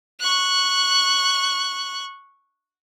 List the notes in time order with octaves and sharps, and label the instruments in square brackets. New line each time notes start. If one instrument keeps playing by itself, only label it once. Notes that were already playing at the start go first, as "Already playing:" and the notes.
[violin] C#6 F#6